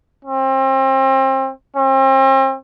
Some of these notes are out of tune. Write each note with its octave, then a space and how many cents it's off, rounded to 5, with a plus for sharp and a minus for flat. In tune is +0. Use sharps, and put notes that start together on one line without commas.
C4 +35
C4 +40